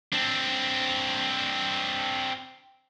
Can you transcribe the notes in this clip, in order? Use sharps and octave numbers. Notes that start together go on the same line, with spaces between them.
C4 D4